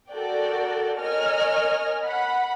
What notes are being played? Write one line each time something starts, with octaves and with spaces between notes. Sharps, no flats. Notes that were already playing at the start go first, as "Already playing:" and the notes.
F#4 A4 A#4 D5 G5
A#4 C#5 D#5 G#5 F6
F#5 B5